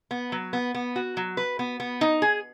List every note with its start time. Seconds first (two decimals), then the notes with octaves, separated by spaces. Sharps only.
0.11 B3
0.32 F#3
0.53 B3
0.75 B3
0.96 F#4
1.17 F#3
1.37 B4
1.59 B3
1.80 B3
2.01 D#4
2.22 G#4